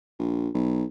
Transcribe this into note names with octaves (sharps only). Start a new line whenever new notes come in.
A#1
B1